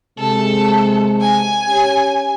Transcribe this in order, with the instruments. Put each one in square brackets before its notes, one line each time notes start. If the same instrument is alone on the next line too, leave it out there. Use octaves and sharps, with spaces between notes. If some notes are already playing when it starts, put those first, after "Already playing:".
[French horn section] C3 G#3 [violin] A4
[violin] G#5
[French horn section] C#4 G4 C#5